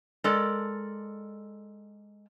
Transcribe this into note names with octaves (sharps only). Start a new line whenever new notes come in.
G#3 A4 A#4 D5